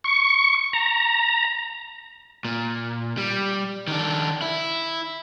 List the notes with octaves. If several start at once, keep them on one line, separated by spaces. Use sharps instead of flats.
C#6
A#5
A#2
G3
D#3 D4
E4